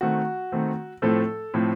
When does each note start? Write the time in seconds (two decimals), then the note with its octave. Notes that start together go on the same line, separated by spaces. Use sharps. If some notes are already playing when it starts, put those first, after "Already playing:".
0.01 D#3 A3 C4 F#4
0.52 D#3 A3 C4
1.02 A2 F3 A3 C4 A4
1.54 A2 F3 A3 C4